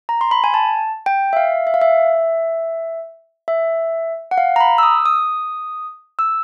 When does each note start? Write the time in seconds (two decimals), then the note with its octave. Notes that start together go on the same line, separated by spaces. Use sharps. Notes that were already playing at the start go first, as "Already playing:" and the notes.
0.09 A#5
0.21 C6
0.31 B5
0.44 G#5
0.54 A5
1.06 G5
1.33 E5
1.37 F5
1.67 E5
1.74 F5
1.81 E5
3.48 E5
4.31 F#5
4.38 F5
4.56 A#5
4.60 B5
4.78 E6
4.83 D#6
5.06 D#6
6.19 E6